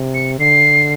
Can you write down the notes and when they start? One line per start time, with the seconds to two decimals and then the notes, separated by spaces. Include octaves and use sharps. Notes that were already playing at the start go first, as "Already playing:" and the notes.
Already playing: C3
0.15 C#7
0.39 D3 C7